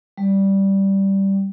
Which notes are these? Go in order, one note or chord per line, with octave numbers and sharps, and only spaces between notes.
G3